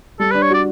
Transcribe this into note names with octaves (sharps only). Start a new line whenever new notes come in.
G3 A4
B4
D4
C#5
F#4 D5